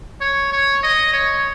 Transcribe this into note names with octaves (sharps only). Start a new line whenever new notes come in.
C#5
C#5
D#5
C#5